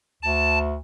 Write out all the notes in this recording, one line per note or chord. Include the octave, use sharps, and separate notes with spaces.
D2 A5